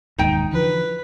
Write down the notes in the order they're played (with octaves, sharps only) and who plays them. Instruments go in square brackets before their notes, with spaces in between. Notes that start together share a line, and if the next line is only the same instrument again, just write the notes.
[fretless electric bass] E1 D#2 G#2 [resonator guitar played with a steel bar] D#4 G5
[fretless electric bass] D3 E3 F3 [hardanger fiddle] B4